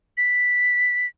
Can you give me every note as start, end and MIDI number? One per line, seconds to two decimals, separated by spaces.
0.17 1.07 95